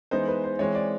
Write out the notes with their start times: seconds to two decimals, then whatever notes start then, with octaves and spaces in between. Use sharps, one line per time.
0.11 E3 G#3 B3 D#4 C5
0.28 B4
0.44 C5
0.59 E3 G#3 C4 C#5
0.75 D5